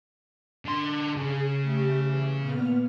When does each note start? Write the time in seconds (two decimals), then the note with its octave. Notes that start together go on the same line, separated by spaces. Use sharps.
0.65 D3 C6
1.17 C#3 G#4
1.61 A3 G4
2.00 E3
2.40 A#2 B3 F6